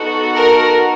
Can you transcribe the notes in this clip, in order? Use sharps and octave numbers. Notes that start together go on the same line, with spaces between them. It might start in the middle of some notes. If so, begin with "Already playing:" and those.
Already playing: B3 D#4 F#4 A4
A#4